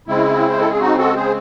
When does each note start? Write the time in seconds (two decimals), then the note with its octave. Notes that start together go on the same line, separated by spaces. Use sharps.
0.07 C#3 G#3 C4 E4
0.49 C5
0.60 A4
0.70 G#4
0.80 D#4 F#4
0.98 F#4 A4
1.16 G#4 C5